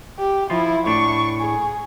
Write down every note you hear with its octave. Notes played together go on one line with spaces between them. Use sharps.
G4
F3 E4 F4
A2 D4 C#6
G#4